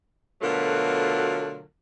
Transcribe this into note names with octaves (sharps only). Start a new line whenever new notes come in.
B2 D3 F#3 A3 F4 A#4